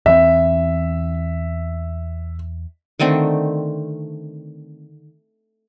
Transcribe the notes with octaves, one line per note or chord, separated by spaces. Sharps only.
E2 E3 C4 E5
D3 D#3 A3 C4